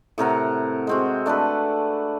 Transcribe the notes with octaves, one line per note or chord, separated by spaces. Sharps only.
A2 C3 A#4 F#5
G#3 C4 F#4
A3 D4 A4 B4